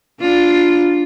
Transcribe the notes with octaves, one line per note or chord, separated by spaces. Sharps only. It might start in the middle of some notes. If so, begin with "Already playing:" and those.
D4 F4